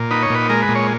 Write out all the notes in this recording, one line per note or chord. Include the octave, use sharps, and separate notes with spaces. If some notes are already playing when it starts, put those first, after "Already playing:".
Already playing: A#2
D#4 B4
C#5
A#2 B4
G#3 A#4
B4
A#2
C#5